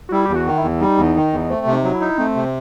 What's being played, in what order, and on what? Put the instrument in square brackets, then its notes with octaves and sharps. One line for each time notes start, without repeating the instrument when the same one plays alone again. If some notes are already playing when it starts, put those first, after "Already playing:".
[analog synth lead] F#4
[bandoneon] G3 [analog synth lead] E4
[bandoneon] E2 [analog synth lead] G4
[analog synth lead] F#4
[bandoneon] D#3
[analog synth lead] E4
[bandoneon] E2
[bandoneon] G3 [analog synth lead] D#4
[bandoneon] E2
D#3
E2
[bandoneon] A3 [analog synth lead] C4
[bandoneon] C3
[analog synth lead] D#4
[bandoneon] F#3
[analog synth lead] E4
[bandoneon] D#4
[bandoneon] A3 [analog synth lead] C4
[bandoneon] C3